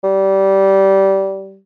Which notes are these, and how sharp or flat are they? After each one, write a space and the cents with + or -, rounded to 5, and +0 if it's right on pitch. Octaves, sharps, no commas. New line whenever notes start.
G3 -20